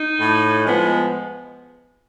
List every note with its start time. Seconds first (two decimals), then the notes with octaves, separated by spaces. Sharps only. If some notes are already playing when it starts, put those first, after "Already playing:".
Already playing: D#4
0.20 A2
0.64 F3 G#3 B3